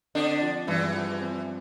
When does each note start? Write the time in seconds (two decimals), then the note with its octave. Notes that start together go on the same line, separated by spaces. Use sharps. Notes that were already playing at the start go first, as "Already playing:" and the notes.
0.15 D3 C4 D4
0.41 F3
0.67 E2 G2 E3
0.95 F3
1.21 C4